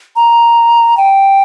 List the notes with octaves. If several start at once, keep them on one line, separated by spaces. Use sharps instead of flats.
A#5
G5